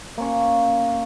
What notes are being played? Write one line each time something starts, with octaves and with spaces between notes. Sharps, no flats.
A#3 C#4 C#5